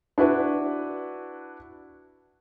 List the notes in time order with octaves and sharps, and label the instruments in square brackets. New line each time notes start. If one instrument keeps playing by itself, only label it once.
[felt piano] D4 E4 F#4 B4